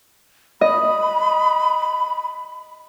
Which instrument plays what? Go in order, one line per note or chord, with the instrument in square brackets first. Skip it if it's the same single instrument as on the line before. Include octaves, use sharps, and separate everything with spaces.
[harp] D#5 [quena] B5